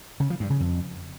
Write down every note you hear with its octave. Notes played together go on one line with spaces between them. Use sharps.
C#3
F3
G2
C#3
F2